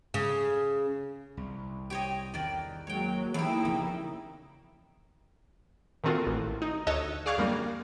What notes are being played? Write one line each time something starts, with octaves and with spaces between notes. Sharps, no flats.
C#3
C2
G4 C#5 D#5
E2 D#3 D5
F#3 G#3 A#3 C#5 G5
E2 A#3 D#4 E4 G4
C#3 F3 B3 G4
A#2 D#3 A3 C4 F4 F#4
A1
D#4
D2 F#4 C#5 D#5 A5 E6
G#4 D5 F5 C#6 F#6 G#6
F#2 D3 G3 A#3